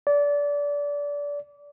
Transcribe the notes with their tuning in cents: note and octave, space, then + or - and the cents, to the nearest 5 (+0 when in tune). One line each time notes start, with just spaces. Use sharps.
D5 -25